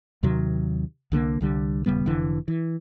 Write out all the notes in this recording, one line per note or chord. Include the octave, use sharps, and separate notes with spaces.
D#2 C3 D#3 F#3
C2 D3 G#3 A#3
C2 D3 G3
D#1 C#3 G3 B3
F1 D3 E3
E3